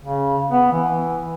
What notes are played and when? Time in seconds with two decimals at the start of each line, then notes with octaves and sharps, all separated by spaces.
0.04 C#3
0.52 B3
0.72 E3